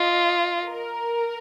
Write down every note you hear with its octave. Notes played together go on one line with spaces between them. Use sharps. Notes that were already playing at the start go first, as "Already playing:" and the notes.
Already playing: F4 D#5
A#4